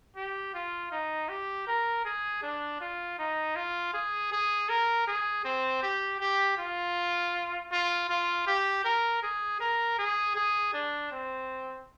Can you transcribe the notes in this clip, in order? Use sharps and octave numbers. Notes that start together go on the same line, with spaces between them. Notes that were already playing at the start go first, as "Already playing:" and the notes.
G4
F4
D#4
G4
A#4
G#4
D4
F4
D#4
F4
G#4
G#4
A#4
G#4
C4
G4
G4
F4
F4
F4
G4
A#4
G#4
A#4
G#4
G#4
D4
C4